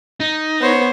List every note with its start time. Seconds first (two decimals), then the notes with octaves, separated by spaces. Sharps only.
0.20 D#4
0.61 B3 C5 C#5